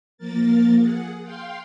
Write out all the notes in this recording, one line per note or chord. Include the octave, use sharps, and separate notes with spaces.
F3 A#3 A#4 A6
G#4 F#5
F5 G5 C6